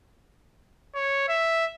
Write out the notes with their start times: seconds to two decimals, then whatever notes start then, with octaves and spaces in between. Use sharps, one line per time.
0.95 C#5
1.28 E5